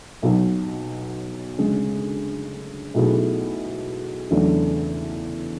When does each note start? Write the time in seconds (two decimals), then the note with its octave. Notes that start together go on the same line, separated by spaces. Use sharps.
0.22 B1 B2 F#3
1.58 D2 C#3 G#3
2.94 B1 B2 A3 E4 G#4
4.30 E2 C#3 F#3 A3 D4